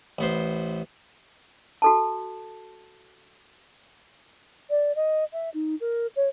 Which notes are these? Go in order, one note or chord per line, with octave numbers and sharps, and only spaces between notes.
A1 B3 C5
F#4 A4 A5
D5
D#5
E5
D#4
A#4
C#5